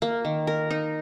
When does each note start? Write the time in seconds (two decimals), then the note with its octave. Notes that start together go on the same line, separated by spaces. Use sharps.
0.02 A#3
0.25 D#3
0.47 A#4
0.71 D#4